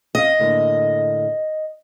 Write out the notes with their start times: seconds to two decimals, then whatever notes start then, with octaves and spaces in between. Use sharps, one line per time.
0.15 C#4 D#5 F5
0.40 A2 D3 A#3